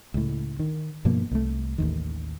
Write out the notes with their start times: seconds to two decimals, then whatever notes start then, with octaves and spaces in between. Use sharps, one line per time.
0.14 C#2 A2
0.59 D#3
1.05 G2 B2 F3 A#3
1.31 C2 A3
1.78 A1 D#2 D#3